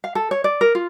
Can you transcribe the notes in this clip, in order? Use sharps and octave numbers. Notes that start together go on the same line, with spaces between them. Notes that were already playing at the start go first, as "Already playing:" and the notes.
F5
A4
C#5
D5
A#4
F4